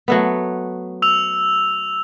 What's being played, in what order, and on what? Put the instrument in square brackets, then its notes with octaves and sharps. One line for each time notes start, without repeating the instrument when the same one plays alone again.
[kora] F#3 A3 B3
[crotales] E6 F7